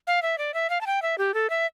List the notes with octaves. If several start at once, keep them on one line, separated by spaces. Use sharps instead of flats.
F5
E5
D5
E5
F5
A5
G5
E5
G4
A4
E5